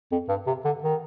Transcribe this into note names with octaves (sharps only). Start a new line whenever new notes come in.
F2
G2
C3
D3
D#3